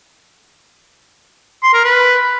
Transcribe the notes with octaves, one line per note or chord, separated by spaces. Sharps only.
C6
A#4
B4